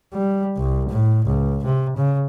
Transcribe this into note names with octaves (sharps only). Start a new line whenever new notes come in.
G3
C2
A2
C#2
C3
C#3